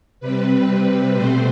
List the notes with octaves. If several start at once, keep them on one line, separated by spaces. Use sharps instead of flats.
C3 G3 C4 B4
B2 A3 C4 C5